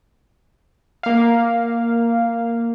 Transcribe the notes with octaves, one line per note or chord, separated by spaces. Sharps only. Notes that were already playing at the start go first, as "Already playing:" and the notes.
A#3 F5